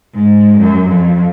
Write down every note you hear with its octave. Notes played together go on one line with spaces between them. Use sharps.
G#2
F#2
F2